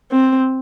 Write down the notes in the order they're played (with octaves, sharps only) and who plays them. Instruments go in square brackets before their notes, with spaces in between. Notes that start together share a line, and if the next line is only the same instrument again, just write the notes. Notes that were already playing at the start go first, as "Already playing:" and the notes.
[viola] C4